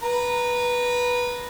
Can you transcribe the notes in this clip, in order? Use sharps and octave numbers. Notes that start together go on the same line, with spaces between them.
B4 A#5